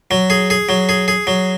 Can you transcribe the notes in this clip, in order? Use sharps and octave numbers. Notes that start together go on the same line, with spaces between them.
F#3
G#4
G#4
F#3
G#4
G#4
F#3